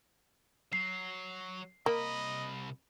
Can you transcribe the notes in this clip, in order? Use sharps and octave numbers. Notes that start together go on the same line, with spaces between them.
F#3 C7
C2 A#3 D#5 B5